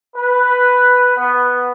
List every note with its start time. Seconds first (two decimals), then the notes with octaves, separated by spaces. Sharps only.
0.16 B4
1.16 B3